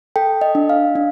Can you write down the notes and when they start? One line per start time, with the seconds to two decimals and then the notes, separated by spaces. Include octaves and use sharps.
0.16 A4 G5
0.41 D#5
0.55 D4
0.69 F5
0.96 D4